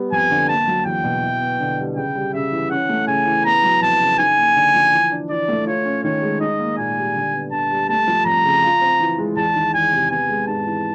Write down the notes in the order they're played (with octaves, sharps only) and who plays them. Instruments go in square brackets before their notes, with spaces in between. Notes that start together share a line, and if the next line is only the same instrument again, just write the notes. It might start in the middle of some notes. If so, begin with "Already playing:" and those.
Already playing: [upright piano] G3 B3
[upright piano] F2 [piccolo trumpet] G#5
[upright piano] D3
[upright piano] A#3 [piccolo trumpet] A5
[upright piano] F#3
[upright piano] E2 [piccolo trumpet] G5
[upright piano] B2
E4
B3
D3
G3
[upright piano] C#3 [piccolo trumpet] G5
[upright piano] G3
[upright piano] C#3 [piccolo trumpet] E5
[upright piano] E3
[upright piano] C#4 [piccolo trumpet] F#5
[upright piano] A3
[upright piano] C#3 [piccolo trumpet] G#5
[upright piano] E3
[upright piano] B3 [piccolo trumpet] A#5
[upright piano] F#3
[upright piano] F2 [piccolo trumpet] A5
[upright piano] C#3
[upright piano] D#4 [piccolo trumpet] G#5
[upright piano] A#3
D3
F3
E3
D4
[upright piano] E3 [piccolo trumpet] D5
[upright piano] A3
[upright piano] F4 [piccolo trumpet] C#5
[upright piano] C#4
[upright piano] D#3 [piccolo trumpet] C#5
[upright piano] G#3
[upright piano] D#4 [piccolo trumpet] D#5
[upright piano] A#3
[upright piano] A#2 [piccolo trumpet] G#5
[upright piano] G3
D3
B3
[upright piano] D3 [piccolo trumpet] A5
[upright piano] G3
[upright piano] A3 [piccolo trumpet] A5
[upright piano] F3
[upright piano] F2 [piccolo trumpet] A#5
[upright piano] C#3
F4
C4
E3
G#3
[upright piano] E2 [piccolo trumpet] A5
[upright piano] D#3
[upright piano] E2 [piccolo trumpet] G#5
[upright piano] C3
[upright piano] B3 [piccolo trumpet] G#5
[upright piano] G#3
[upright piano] G#2 [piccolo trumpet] A5
[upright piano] E3